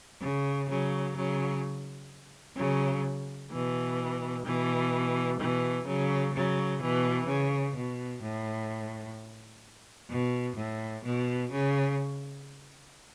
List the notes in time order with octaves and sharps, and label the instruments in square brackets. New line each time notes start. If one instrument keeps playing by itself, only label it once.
[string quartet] C#3
C#3 F#3
C#3 F#3
C#3 F#3
B2 E3
B2 E3
B2 E3
C#3 F#3
C#3 F#3
B2 E3
C#3
B2
A2
B2
A2
B2
C#3